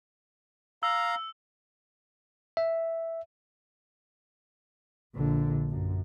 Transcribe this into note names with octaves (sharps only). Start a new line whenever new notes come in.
F5 A#5 E6
E5
A#1 D3
F#2